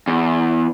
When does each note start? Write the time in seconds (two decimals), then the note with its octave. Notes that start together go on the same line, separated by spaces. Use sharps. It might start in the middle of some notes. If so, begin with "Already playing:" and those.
0.07 E2